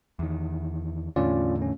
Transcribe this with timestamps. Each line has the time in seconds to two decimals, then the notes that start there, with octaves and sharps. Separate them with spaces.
0.19 E2 D#3
1.16 E2 A2 D3 C#4 F4 D5
1.62 C#4